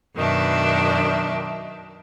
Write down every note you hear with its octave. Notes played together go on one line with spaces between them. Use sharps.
F#2 B2 D#3 D4 E4